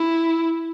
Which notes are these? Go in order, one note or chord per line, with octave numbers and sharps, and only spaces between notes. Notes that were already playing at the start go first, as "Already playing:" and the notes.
Already playing: E4